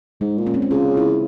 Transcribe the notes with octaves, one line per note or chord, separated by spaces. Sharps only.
G#2 G#3
A#2
C#4
C4
C#4
C#3 F4
E4